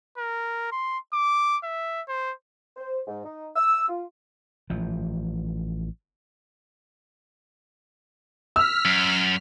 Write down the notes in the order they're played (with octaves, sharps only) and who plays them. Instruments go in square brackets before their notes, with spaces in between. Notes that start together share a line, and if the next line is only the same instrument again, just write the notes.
[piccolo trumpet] A#4
C6
D6
E5
C5
[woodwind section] C5
G#2
D#4
E6
F4
[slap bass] A1 F3
[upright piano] E6 [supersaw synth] F6 B6
[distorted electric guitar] F#2